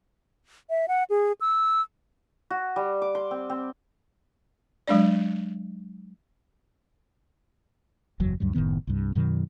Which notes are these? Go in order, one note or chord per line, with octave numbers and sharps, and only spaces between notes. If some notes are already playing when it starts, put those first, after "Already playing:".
E5
F#5
G#4
E6
F#4
G3
D6
C6
C4
C4
F#3 G#3 D4 D5
F#1 E2 F#3
D2 G2 F#3 G3
F#1 A2 D#3 B3
C2 G2
F#2 B2 D#3 F#3